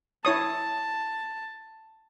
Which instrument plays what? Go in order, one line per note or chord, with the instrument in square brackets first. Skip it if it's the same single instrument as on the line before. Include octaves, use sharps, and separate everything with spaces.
[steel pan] E4 C#5 D#6 [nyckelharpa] A5